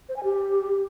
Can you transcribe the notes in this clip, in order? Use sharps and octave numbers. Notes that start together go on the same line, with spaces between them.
C5
G#5
G4